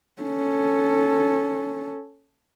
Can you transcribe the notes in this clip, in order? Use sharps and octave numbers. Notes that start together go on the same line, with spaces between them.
C#4 A4